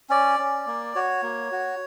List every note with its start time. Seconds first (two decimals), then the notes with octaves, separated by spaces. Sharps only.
0.10 C#4 D5
0.39 C#4
0.67 A#3
0.95 F#4 C#5
1.23 A#3
1.52 F#4